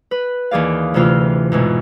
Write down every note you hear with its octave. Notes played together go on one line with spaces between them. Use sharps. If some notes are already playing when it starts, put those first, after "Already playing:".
B4
D#2 E3 G#4 D5 F5
D2 C3 E3 F4 F6
E2 G#2 B2